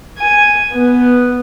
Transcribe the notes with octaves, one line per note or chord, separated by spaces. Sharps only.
G#5
B3